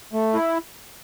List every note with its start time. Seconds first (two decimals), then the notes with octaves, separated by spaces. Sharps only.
0.13 A3
0.34 E4